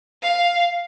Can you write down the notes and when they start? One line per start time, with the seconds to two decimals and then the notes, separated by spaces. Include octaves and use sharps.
0.22 F5